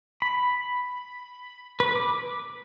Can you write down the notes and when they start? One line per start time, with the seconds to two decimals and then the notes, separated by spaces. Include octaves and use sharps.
0.22 B5
1.80 B4
1.95 D6